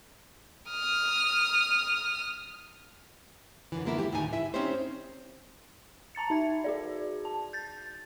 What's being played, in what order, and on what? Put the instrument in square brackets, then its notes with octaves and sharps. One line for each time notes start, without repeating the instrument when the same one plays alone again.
[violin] D#6 F6
[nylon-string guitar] F#2 D3 E3
D3 F3 G#3 A#3 B3 E4
E4 G4
D2 A2 D#3 D#4 E5 G#5
G2 E4 E5
C4 C#4 D#4 E4 G4 C5
[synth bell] A5 A#5 A6 C#7
D#4 E5 G#6
F#4 G#4 D5
A5
G6 A6